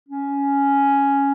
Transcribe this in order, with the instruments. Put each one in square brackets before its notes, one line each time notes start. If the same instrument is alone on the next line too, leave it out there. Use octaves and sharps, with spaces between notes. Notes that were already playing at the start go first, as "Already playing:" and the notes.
[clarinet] C#4